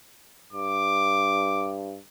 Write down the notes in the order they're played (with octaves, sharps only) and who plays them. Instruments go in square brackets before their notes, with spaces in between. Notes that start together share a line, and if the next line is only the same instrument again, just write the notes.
[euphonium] G2 [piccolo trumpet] D6